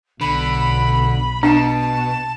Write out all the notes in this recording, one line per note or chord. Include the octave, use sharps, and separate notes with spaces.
B1 D3 B5
B2 D4 A5